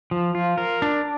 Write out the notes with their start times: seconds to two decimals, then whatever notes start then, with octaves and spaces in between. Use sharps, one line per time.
0.11 F3
0.35 F4
0.58 A#4
0.82 D4